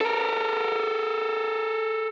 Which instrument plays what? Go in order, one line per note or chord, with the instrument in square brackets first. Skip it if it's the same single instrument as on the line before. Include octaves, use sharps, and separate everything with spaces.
[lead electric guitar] A4 A#4